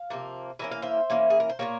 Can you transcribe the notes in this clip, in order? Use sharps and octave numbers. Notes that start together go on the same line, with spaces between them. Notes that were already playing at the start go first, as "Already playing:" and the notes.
Already playing: F5
C3 F3 A#3
E3 A#3 C#4 E5
F5
C5 E5
E3 A#3 C#4
G#4
A#4
C5
A#2 G3 A#3 A#4 C#5